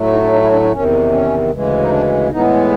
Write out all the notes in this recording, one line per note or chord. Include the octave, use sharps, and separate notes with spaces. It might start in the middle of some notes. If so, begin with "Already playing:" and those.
Already playing: A2 F#3 A3
D#4
D4
D#4
E4
D4
D4
E2 C3 D#3 C#4
C#4
D2 C#3 E3 G#3
D#4
D4
A2 E3 G#3 B3 D#4